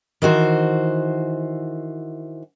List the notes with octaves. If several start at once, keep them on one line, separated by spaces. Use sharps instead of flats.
D#3 E3 F#4 C5